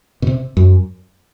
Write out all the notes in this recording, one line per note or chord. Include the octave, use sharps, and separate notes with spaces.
B2
C3
F#2